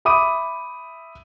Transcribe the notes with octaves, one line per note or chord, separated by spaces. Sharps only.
E5 B5 D6 D#6 D#7